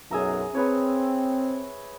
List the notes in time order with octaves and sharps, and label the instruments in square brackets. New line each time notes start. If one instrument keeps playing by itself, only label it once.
[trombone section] B1 F#2 [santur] G#4 E5 A#5
[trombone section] C4 [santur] G#4 B4 C#5